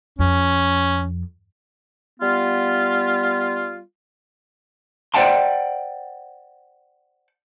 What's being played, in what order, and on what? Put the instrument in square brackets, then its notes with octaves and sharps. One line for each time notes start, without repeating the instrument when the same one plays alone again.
[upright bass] F2 [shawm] C#4
[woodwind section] G3 B3 F4
[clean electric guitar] C5 D5 F#5 G5 A5 C6